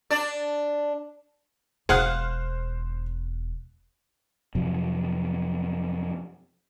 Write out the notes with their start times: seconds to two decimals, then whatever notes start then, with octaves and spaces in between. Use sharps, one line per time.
0.11 D4 D5
1.89 E1 G#4 C5 F5 F#5 F6 F#6
4.55 F2 C3 F#3